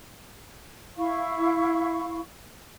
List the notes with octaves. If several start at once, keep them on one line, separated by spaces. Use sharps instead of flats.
E4 F5 C#6